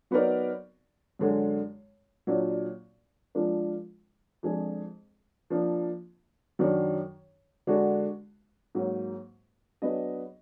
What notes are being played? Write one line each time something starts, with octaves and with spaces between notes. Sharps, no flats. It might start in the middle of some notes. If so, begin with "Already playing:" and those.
F#3 B3 D#4 A#4 D5
F#2 D3 G#3
A#2 F#3 D4
F3 G#3 D4 F4 A#4
F2 F3 G#3 D4 G#4
F3 A#3 D4
F#2 D#3 F#3 D4
D3 G#3 D4 F#4
G#2 F#3 A#3
F#3 B3 D4 G#4 D#5